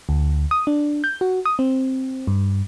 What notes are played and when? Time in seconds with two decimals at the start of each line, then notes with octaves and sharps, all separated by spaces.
0.09 D2
0.51 D#6
0.67 D4
1.04 G6
1.21 F#4
1.46 D#6
1.59 C4
2.27 G2